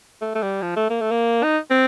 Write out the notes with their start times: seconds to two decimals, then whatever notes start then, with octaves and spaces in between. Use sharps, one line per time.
0.22 A3
0.35 A3
0.43 G3
0.62 F3
0.76 A3
0.90 A#3
1.01 A3
1.11 A#3
1.44 D#4
1.71 C4